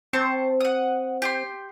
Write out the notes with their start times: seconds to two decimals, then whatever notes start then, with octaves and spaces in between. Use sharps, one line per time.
0.13 C4 C5 A5 C#6
0.60 F#5 D#6
1.22 G4 G5 C6